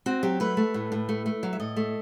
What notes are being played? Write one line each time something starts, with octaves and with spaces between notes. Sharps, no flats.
C4 F#4
F#3 G4
A3 B4
A3
A2
A2
A3
A3
F#3
E5
A2 D#5
A3